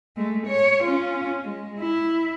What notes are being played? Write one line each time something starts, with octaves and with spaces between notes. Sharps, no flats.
G#3 A3
C#5
C#4 F4
G#3
E4